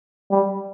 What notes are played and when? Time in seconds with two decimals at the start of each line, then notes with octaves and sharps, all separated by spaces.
0.31 G3